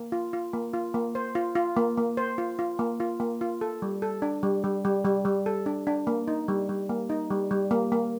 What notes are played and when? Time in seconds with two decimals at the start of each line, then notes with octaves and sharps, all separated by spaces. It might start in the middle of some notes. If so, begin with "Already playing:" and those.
Already playing: A#3
0.12 F4
0.33 F4
0.53 A#3
0.74 F4
0.94 A#3
1.15 C5
1.35 F4
1.55 F4
1.77 A#3
1.97 A#3
2.17 C5
2.38 F4
2.59 F4
2.79 A#3
3.00 F4
3.20 A#3
3.41 F4
3.61 A4
3.82 G3
4.02 A4
4.22 D4
4.43 G3
4.64 G3
4.85 G3
5.05 G3
5.25 G3
5.46 A4
5.66 D4
5.87 D4
6.07 A#3
6.28 D#4
6.48 G3
6.69 G3
6.89 A#3
7.10 D#4
7.31 G3
7.51 G3
7.71 A#3
7.92 A#3